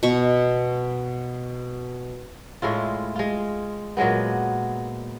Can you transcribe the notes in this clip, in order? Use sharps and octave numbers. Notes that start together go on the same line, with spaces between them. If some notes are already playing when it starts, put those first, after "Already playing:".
B2 C#6
A2 G#3 E4 F4
G#3 F4
A#2 F#3 G#3 B3